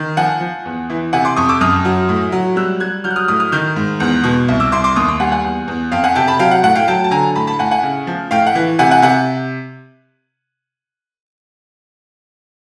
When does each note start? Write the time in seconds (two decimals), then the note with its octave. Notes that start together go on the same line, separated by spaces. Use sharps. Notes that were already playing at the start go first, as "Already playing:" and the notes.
Already playing: D#3
0.17 F3 F#5 G#5
0.41 F3
0.65 E2
0.90 E3
1.13 C3 F#5 G#5
1.25 C6 D6
1.36 F2 C#6 D#6
1.49 D6 E6
1.61 F#2 D#6 F6
1.85 F#3
2.09 A2
2.32 F#3
2.56 G3 E6 F#6
2.80 G3 F#6 G#6
3.04 F#3 F6 G6
3.11 F#6
3.16 D#6 F6
3.28 A2 D#6 F6
3.40 D#6 F6
3.52 D#3 F6 G6
3.76 G#2
4.00 E2
4.24 B2
4.48 C2
4.60 D6 E6
4.72 C2 C6 D6
4.84 C6 D6
4.96 D#2 C#6 D#6
5.08 C6 D6
5.20 G3 F#5 G#5
5.32 F#5 G#5
5.44 E2
5.68 E2
5.92 F2 F5 G5
6.04 F#5 G#5
6.15 C3 G5 A5
6.28 A5 B5
6.39 F#3 F5 G5
6.51 F#5
6.63 A2 F#5
6.75 F5 G5
6.88 F#3 G5 A5
7.04 A5
7.11 D3 G#5 A#5
7.35 A2 A5 B5
7.47 A5 B5
7.59 A2 F#5 G#5
7.71 F#5 G#5
7.83 C#3
8.07 F3
8.31 A2 F5 G5
8.46 F#5
8.55 E3
8.79 C3 F#5 G#5
8.91 F#5 G#5
9.02 C3 F#5 G#5